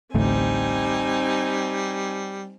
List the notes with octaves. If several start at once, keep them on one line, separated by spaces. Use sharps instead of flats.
A1 D2 A2 G3 C4 D#4 G#5